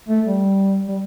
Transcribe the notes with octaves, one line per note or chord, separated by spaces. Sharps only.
A3
G3
G3